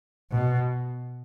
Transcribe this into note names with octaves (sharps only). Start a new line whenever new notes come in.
B2